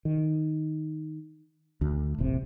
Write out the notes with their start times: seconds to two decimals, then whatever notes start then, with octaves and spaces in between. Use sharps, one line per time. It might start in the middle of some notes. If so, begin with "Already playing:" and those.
0.05 D#3
1.81 D2
2.18 D#1 A1 C3